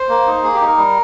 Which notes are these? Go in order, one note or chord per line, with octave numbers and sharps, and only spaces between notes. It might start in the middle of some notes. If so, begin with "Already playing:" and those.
Already playing: C5
A#3
D#4
A#3 G#4
G4
D#4
A#4
G3